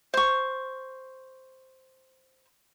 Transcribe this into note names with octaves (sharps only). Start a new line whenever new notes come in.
C5 C#6